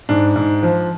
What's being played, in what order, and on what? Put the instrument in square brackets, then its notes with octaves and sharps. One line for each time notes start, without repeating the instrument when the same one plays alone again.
[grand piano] G#2 [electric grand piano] D4
[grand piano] G#2
F3